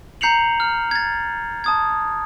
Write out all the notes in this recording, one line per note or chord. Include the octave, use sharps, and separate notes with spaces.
A#5 G6 C7 C#7 F7 F#7
F6
G#6 A6
A5 D#6 G#6